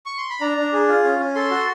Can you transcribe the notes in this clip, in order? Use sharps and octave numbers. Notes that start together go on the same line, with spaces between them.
C#6
C6
B5
D4 A#5
D4
G#4
F4
C#4
C#4
A4 C6
F#4